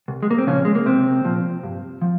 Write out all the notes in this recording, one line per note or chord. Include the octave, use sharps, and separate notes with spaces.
C2
G#3
A#3
C4
A#2 C#3 F3 C#4
G#3
A#3
C2 C3 C4
A#2 F3
G2
F3